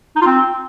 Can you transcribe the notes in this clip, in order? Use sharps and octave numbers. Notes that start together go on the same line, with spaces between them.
D#4
F4
C4